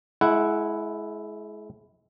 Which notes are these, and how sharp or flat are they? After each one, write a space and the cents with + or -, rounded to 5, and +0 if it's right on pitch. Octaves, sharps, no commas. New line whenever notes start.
G#3 +35 E4 +0 F#5 +0